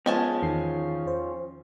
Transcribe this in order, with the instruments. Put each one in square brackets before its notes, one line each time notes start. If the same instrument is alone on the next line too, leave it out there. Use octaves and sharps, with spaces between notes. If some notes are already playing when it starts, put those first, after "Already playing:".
[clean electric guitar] F3 C#4 [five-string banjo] G#3 G#5 A5 [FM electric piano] B3
[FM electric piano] E2 D#3 C7
C5